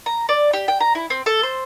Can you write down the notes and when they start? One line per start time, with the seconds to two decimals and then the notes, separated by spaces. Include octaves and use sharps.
0.06 A#5
0.29 D5
0.53 G4
0.68 G5
0.81 A#5
0.95 E4
1.10 C4
1.26 A4
1.43 C5